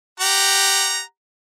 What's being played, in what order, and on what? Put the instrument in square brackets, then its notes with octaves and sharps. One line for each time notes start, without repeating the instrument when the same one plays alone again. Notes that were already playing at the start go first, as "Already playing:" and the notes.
[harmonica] G4 F#5 A#5